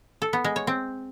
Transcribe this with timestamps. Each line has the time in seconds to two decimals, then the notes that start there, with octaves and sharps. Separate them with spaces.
0.22 A4
0.33 B3
0.44 G#3
0.56 C#5
0.67 C4